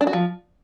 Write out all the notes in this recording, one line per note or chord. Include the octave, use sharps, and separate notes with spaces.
D4
F#4
F3